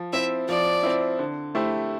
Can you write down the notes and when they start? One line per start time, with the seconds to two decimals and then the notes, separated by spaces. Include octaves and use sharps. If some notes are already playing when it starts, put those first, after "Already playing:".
Already playing: F3
0.13 C4 E4 E5
0.48 F3 D5
0.83 C4 E4
1.19 D3
1.55 A3 E4 G4 C5